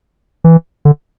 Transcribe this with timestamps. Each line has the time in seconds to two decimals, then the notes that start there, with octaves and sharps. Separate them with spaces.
0.44 E3
0.85 D3